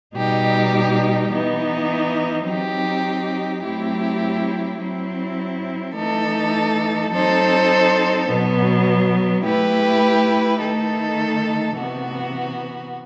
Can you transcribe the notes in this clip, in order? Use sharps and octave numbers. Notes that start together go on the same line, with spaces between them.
B2 G3 D#4 G4
E3 B3 D#4
F#3 C4 D#4 G4
F#3 A3 C4 E4 G4
F#3 C4 E4
E3 A3 D#4 A4
F#3 C4 D#4 A4 C5
B2 F#3 B3
A3 E4 G4 B4
D#3 A3 D#4 A4
C3 E3 B3 F#4